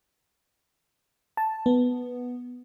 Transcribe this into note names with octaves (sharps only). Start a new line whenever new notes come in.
A5
B3